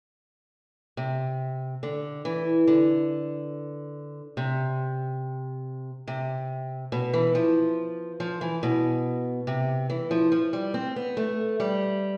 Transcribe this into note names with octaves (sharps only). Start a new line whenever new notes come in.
C3
D3
E3
D3
C3
C3
B2
E3
F3
F3
E3
B2
C3
E3
F3
F3
G3
C4
B3
A3
G3